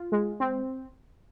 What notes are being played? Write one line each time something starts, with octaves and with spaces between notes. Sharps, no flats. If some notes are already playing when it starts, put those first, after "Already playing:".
Already playing: F4
G#3
C4